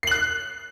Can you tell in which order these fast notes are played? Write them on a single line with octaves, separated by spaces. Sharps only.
C7 F#7 F#6